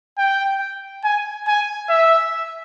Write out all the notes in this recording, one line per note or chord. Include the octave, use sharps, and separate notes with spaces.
G5
G#5
G#5
E5